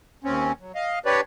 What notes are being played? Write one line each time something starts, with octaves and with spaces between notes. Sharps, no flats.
D#2 C4 C#4
F#3
D#5 F5
D4 G4 B4 C#5 D5